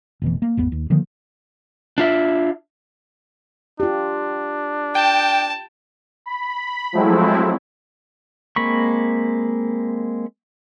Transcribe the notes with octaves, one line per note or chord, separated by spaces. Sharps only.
F1 B2 E3
A#3
G#1 E2 B3
D#2
D3 D#3 F3 A#3
D4 F4 E5
D4 F4 G4
G5 A5
B5
F3 F#3 G#3 A3 C4 E4
G#3 A#3 C4 B5 C#6